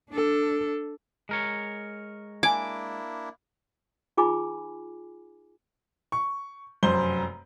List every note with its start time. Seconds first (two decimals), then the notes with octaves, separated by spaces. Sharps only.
0.10 D4 A4
1.29 G#3 A#4 C#5
2.43 A#3 D4 E4 G#5 D6 G#6
4.17 D#4 F4 G#4 G#5 B5 D6
6.12 C#6
6.83 F1 F#2 C5 C6 G7